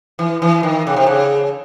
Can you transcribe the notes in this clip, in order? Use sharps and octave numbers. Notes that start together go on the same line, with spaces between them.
E3
E3
D#3
C#3
C3
C#3